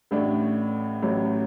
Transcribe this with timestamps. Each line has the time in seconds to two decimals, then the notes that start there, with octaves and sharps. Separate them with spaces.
0.11 A1 A2 A3 D4
1.02 A1 A2 F#3